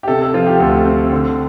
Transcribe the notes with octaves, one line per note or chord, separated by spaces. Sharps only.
G4
C3 A4
A4
F3 F4
G4
D2 A4
C4
D3